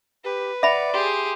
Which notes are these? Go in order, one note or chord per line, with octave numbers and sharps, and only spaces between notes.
G4 B4
D5 E5 F#5 B5
G4 G#4 C6